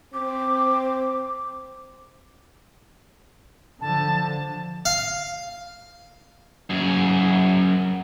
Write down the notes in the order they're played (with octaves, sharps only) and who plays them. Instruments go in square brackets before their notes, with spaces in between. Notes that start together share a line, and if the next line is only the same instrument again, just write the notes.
[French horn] C4 [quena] D6
[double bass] D3 F3 [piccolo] A5
[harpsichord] F5
[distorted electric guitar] F#2 G#4